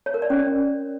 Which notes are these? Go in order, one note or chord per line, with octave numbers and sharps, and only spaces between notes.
C#5
A#4
D5
C#4